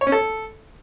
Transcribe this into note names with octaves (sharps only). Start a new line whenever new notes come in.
C#5
C#4
A4